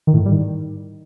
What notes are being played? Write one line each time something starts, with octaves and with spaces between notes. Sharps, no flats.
D#3
A2
G#2
G3
D#3